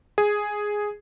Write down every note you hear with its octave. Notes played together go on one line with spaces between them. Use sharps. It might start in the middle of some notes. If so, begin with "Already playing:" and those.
G#4